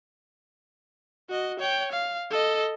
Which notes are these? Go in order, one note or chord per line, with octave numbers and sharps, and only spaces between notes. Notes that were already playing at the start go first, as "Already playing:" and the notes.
F#4 D#5
C#5 G5
F5
A4 D#5